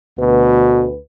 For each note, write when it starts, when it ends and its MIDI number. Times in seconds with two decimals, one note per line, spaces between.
0.18 0.97 38
0.18 0.85 47
0.18 0.97 66
0.18 0.97 71